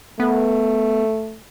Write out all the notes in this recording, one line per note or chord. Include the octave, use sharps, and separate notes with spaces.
A3 B3